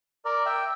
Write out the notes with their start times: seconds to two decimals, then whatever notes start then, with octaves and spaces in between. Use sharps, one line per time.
0.25 A#4 D5
0.46 E5 G5